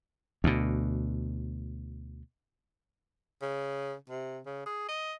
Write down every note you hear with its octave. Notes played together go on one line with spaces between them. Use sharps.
D2 B2
C#3
C3
C#3
G#4
D#5